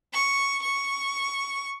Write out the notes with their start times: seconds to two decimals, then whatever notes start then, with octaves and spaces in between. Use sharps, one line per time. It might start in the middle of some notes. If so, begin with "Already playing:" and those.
0.13 C#6
0.62 C#6